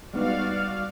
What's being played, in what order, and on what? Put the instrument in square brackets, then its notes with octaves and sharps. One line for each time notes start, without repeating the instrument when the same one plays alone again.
[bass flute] G3 [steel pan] G#3 B3 D#4 [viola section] F#4 D5 F5